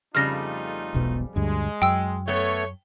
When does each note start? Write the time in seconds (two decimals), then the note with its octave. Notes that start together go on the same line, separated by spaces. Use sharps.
0.15 F2 C#3 G3 A3 D#4 F4 F6 A#6
0.94 E1 B1 B2
1.36 D2 G2 G#3
1.82 F#2 G5 E6
2.28 A3 B3 C#5